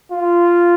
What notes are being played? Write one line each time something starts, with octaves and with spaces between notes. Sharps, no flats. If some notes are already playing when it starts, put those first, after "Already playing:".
F4